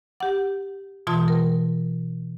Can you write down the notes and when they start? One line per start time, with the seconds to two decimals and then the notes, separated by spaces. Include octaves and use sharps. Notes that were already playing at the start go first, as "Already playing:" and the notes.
0.20 G4 F#5
1.07 B2 E3 F4 A5 C6 D#6
1.28 A#4